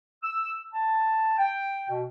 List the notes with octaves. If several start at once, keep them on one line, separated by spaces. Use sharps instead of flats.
E6
A5
G5
B2